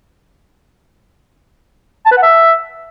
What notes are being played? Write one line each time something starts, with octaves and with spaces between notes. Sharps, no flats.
A5
B4
F#5
E5